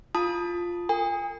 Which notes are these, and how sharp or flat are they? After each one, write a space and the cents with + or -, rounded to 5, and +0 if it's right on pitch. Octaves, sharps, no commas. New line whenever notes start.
F4 +0 A5 +0 D#6 +0
A#4 -40 G#5 -40